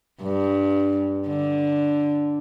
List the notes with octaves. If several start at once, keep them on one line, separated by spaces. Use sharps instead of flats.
G2
D3